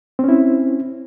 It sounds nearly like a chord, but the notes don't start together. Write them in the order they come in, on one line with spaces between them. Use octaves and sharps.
C4 C#4 E4